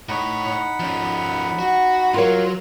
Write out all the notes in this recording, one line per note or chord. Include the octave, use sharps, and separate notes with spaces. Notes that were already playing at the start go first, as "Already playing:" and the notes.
A2 D#4 C#5 F#5 B5
F3 C#4
F#4
F#3 F4 A#4 C#5